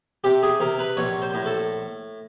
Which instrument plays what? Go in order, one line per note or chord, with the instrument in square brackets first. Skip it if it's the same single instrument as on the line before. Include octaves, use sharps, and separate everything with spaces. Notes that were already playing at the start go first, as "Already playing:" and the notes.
[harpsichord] C3 G4
G#4
C3 A#4
B4
A#1 C#5
C5
A2
A4